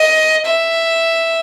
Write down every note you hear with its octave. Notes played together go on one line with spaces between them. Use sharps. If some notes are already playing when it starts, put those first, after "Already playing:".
Already playing: D#5
E5